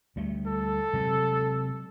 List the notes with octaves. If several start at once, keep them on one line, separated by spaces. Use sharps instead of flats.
D2 G3 A3
A4
C3 F#3 G#3